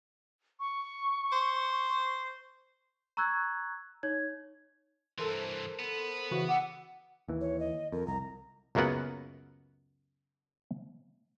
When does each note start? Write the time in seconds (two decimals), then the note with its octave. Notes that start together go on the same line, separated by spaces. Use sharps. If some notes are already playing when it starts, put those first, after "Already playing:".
0.60 C#6
1.32 C5
3.17 A#5 C#6 E6 F#6 G#6
4.03 D#4 C#5 G#6
5.18 G2 E3 A4 A#4 C5
5.79 B3
6.31 C#3 E3 F#4
6.49 F#5 D6 E6
7.28 D#2 E3
7.41 C#5
7.60 D#5
7.92 F2 A#4
8.07 C2 A#5
8.75 C#2 F#2 F#3 A#3 B3 F#5